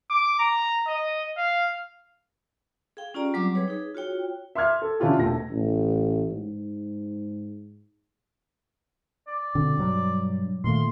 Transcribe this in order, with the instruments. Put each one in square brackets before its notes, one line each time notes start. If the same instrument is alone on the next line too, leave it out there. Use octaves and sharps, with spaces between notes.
[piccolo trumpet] D6
A#5
D#5
F5
[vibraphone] G#4 F5 G5
C#4 F4 G4 D5 A#5
F#3 G3 C4 D6
G#4 B4 C#5
D#4 G#4
F4 F#4 C#5 G5
[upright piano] E5 C6 D6 F6 G#6
A4
D3 C#4 E4 F4 G4
E1 A3 A#6
[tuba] A1
G#2
[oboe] D5
[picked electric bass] B2 C4 [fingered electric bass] D3
[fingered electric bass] G2 [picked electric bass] B2 F#3 G3
[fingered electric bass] A#2 A3 [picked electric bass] D#3 A#3 [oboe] C6